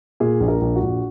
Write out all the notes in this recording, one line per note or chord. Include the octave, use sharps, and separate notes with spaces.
A#2 G#4
A#1
A#4
A#1
F#4
A#1